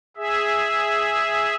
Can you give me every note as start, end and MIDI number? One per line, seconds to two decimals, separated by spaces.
0.17 1.56 68
0.17 1.56 76